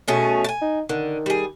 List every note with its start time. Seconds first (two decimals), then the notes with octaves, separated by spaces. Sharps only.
0.08 B2 A3 C#4 G#4
0.44 G#5 A5
0.61 D#4
0.89 D3 D#3
1.26 G3 G#4